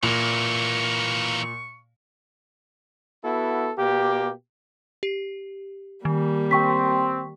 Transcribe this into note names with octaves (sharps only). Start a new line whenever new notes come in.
A#2 E3 A#3 C#6
B3 E4 F#4 A4
B2 A#3 G4
G4
D#3 G3 A#3
C4 G5 C#6 B6